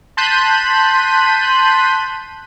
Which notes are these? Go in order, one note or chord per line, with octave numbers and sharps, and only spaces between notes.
A5 C6 F#6 G6 B6 D#7